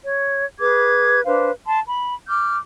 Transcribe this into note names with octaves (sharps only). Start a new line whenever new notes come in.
C#5
G#4 B4 D6 G#6
D4 B4 C5 F5
A5 C6
B5
D6 F6 G6